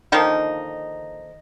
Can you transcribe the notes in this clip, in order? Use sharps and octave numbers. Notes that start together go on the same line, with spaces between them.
D3 D#3 F3 A#3 D#4